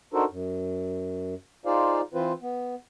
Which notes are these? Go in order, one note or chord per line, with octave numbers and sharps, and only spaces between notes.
D4 D#4 F#4 A4 A#4 C5
F#2
D#4 F4 G#4 C5 D5 F5
E3 C4 F4 B4 C5
B3